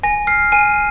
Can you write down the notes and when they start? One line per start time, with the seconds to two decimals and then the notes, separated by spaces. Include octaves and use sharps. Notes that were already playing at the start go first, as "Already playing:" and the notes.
0.03 G#5 A#6
0.27 F6 C7
0.52 G#5 D#7